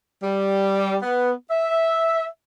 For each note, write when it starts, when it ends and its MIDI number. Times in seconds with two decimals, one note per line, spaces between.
0.23 0.96 55
1.02 1.32 59
1.50 2.25 76